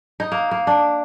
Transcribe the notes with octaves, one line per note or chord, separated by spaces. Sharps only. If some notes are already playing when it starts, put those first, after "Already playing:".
D#4
A#3
A#3
D4